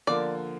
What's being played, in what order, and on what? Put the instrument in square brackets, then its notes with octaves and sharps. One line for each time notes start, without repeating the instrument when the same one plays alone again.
[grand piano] D3 F3 A#3 [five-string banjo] D5